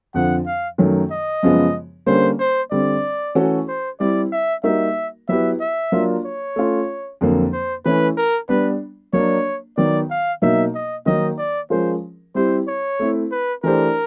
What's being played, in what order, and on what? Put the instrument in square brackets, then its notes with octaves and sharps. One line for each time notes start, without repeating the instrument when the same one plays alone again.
[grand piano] F2 D3 F3 [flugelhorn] F#5
[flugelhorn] F5
[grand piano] F#2 D#3 F#3 A3
[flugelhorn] D#5
[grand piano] F#2 C#3 F3 G#3 B3
[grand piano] D3 G3 A#3 C#4 [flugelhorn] C5
[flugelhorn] C5
[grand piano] D3 G3 C4 [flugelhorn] D5
[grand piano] E3 A3 C#4 F#4 A4
[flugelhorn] C5
[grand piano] G3 C4 E4 [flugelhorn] D5
[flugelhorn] E5
[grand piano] G3 A#3 D#4 F#4 A#4 [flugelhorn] E5
[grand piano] F#3 B3 E4 G4 B4 [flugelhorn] E5
[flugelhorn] E5
[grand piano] F#3 A#3 D4 F4
[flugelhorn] C#5
[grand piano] A3 C#4 F4
F2 D3 F#3 A#3
[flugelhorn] C5
[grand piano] E3 A3 C#4 E4 [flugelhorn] B4
[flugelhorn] A#4
[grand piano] G3 B3 D4 [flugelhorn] B4
[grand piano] F#3 A#3 D4 [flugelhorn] C#5
[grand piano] D#3 F#3 B3 [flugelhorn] D5
[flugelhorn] F5
[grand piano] B2 F#3 A#3 D#4 [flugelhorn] E5
[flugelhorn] D#5
[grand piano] D#3 F#3 A#3 D#4 [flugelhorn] D#5
[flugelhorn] D5
[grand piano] F3 G#3 C#4 F4 A#4 [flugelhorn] C5
[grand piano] G3 C4 E4 G4 [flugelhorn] C5
[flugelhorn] C#5
[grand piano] A3 C4 E4
[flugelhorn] B4
[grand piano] E3 A3 D4 G4 C5 [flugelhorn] A#4